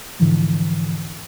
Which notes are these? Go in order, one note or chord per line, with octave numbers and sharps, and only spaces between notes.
G#2 D3 E3 F3